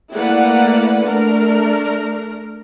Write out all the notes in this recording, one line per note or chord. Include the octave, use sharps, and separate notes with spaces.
A3 A#3 E4 B4 D5 F#5
A3 D4 A#4